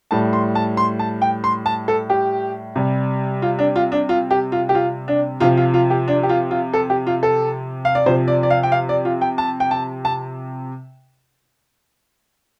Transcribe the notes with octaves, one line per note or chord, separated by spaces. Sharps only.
A2 G3 A5
C6
A5
C6
A5
G5
C6
A5
A4
G4
C3 G3
F4
D4
F4
D4
F4
G4
F4
G4
F4
D4
C3 F3 F4
F4
F4
G4
D4
G4
F4
F4
A4
G4
F4
A4
F5
D5
C3 F3 C5
D5
D5
F5
G5
F5
D5
F4
G5
A5
G5
A5
A5